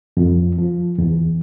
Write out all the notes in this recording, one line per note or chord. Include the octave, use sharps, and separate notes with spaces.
F2
F3
E2